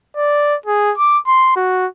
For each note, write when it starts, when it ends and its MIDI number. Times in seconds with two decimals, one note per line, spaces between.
0.17 0.56 74
0.66 0.93 68
0.98 1.19 86
1.27 1.51 84
1.56 1.87 66